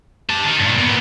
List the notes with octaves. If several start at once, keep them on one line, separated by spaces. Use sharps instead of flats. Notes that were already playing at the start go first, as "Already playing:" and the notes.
G4 A5
D#3
G2 A#2
A#2 B3